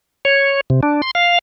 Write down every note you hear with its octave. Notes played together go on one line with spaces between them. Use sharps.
C#5
C3
D4
C6
F5